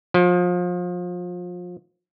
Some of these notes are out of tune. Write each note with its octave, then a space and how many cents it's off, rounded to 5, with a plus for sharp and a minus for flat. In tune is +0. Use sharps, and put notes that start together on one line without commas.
F3 +30